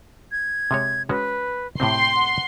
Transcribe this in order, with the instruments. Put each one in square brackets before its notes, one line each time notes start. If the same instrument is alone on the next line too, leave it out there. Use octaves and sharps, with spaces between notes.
[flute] G#6
[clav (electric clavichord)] C3 G#3 C#5
[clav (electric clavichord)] G#3 C#4 F#4 [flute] B4
[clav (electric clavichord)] A2 C3 C4 [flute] G5 [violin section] C6
[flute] F#5